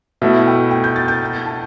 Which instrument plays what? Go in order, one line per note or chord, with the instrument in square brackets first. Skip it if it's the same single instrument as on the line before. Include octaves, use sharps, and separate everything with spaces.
[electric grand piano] B2 A3 E4 [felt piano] E5
[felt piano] G5
G5
G6
A6
G6
A5